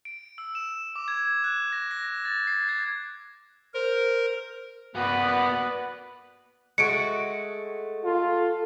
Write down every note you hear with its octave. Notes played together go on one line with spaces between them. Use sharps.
D7
E6
E7
D6
G#6
F#6
A#6
A#6
A6
C7
G#6
A#4 C5
A#3 B3 F#4 B4 D5
G#3 A3 F#4 C#7 D7
F4 A4